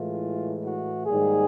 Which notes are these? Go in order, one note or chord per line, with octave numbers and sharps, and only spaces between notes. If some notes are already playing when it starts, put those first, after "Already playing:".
Already playing: A2 E3 G#3 F4
F#4
G#2 D#3 G3 A#3 G#4